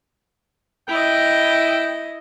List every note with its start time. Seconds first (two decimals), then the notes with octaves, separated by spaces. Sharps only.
0.88 E4 D#5 G5